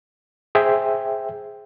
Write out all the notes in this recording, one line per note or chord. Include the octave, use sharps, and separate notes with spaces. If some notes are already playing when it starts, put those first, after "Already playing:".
G#4 C5 E5 G5